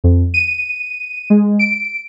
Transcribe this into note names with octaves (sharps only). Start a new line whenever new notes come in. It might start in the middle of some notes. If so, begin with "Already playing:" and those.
F2
D#7
G#3
D7